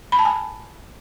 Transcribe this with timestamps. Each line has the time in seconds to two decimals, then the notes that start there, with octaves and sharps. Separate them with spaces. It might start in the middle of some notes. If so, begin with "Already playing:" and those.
0.12 B5
0.19 A5
0.25 G#5